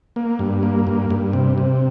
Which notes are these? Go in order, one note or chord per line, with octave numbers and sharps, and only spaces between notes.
A#3
G2
A#3
G2
G2
C3
C3